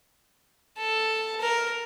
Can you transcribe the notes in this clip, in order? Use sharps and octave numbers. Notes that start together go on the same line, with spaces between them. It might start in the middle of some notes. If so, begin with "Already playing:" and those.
A4
A#4